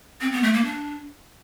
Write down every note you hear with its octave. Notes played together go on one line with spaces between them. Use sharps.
C4
B3
A3
A#3
D4